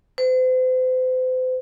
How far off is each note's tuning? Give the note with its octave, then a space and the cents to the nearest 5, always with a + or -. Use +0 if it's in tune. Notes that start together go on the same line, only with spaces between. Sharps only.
C5 -40